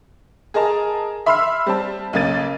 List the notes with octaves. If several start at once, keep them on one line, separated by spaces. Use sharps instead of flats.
G#4 A#4 D#5 A5 A#5
E5 B5 C6 E6 F6 C7
G3 C4 A5
B1 C#3 A#3 G#6 A6 D#7